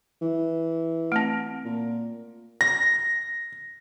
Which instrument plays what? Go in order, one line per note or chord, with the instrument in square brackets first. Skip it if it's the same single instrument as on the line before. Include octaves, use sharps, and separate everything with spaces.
[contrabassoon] E3
[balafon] A3 C4
[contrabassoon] A#2
[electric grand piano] A#6